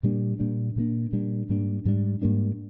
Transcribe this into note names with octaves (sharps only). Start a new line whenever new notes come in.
A#2 G3 A#3 D4
A#2 G3 A#3 D4
A#2 G3 A#3 D4
A#2 G3 A#3 D4
G#2 G3 A#3 D4
G#2 G3 A#3 D4
G#2 G3 A#3 D4